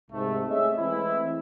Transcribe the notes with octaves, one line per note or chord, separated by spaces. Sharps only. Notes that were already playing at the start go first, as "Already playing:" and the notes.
C2 G#2 A3
A3 C#4 G#4 D#5 E5
E3 G#3 A3 C4 E4